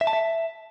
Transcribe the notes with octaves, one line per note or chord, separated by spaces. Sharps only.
E5
A5
E5